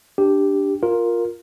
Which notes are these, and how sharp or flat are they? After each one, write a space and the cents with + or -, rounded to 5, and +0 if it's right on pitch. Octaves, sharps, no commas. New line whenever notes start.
D4 +0 G4 +0
F4 +10 A#4 +0